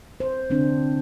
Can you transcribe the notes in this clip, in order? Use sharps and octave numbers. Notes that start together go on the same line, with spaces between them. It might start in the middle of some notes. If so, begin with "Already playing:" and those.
C5
D3 C4 D4